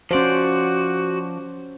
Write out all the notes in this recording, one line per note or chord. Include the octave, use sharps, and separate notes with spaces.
F3 C#4 F#4 C5 D5